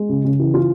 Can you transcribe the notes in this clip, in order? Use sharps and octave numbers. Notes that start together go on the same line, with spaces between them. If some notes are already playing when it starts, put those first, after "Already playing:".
Already playing: G#3
C#3
C#3
E3
F4